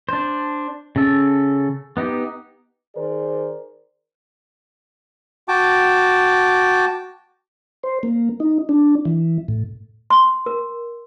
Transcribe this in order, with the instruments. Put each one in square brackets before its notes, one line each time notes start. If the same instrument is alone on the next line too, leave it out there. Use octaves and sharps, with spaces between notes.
[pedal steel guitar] D4 C5
C#3 A4
B3 D#4 G4
[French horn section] D#3 G#4 A#4 C5 D5
[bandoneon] F#4 G5 A5 D6
[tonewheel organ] C5
A#3
D#4
D4
E3
A2
[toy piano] C6
A#4